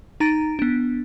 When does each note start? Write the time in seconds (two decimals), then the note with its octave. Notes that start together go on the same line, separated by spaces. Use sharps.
0.20 D#4 A#5 A6 D7
0.59 B3 D4